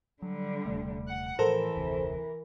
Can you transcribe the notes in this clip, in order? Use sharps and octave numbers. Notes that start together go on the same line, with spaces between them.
D3 F#3 G3
D#1 C3 A3
F#5
A2 E3 F3 A4 A#4 C5
F1 D2 C3